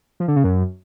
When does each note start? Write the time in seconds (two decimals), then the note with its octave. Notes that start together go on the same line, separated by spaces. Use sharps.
0.20 F3
0.28 D3
0.36 C#3
0.44 F#2